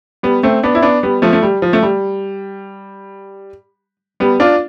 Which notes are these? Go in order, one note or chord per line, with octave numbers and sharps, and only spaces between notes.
G3 B3
A3 C4
B3 D4
E4
B3 D4
G3 B3
F3 A3
A3
G3
F3
A3
G3
G3 B3
D4 F4